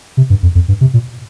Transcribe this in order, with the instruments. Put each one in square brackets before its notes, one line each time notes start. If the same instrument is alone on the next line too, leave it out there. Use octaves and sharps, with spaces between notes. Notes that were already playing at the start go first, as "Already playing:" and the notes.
[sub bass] C3
G2
F2
F2
G2
C3
A#2